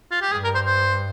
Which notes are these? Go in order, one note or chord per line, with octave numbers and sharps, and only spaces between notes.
F4
G4
G2 G#4
A#4
C5
C5